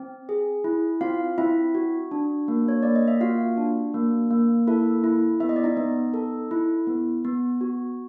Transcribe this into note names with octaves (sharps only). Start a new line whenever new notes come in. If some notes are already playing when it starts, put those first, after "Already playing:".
Already playing: C4
G#4
E4
C4 F4 F5
C4 E4 E5
F#4
D4
A#3
C#5
A#3 D5
D#5
E5
F4 F#4 F5
D4
A#3
A#3
E4 A4 E5
E4
B3 E5
D#5
D5
D#4 D#5
B3
A4
E4
B3
B3
F#4